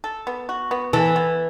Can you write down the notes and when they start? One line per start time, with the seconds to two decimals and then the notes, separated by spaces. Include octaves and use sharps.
0.04 A4
0.27 B3
0.49 F#4
0.71 B3
0.93 E3 A4
1.16 B3